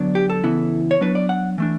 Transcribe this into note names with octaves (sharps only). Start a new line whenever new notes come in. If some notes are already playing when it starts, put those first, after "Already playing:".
Already playing: D3 F#3 B3 D4
G4
A4
C#3 E3 B3 E4
C#5
F#3 B3 D4 B4
D5
F#5
E3 A3 D4